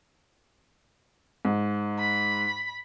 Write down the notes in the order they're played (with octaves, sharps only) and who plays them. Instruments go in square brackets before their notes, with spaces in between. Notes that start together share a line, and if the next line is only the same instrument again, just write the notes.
[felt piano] G#2
[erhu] B5